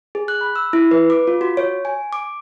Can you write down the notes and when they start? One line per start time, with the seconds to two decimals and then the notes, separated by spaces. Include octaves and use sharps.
0.15 G#4
0.28 F#6
0.41 B5
0.56 E6
0.73 E4
0.91 B4
1.10 D6
1.27 F4
1.41 F#4
1.57 C#5
1.85 G#5
2.13 D6